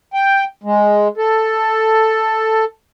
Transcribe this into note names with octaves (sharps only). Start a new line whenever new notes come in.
G5
G#3
A4